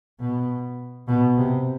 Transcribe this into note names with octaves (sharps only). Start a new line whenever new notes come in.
B2
B2
C3